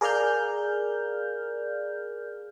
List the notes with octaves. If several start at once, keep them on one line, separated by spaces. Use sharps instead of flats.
G#4 A#4 D5 F5 F6 G6